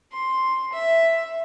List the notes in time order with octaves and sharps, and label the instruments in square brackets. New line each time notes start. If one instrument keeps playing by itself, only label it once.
[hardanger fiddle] C6
E5